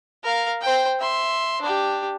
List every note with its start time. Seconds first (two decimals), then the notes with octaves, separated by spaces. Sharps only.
0.24 A#4 F5
0.61 C5 G5
1.00 E5 C6
1.61 D4 G4